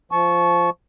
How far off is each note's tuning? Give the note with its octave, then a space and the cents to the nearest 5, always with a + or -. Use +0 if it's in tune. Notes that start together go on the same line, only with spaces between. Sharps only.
F3 -10 A5 -25 C#6 +0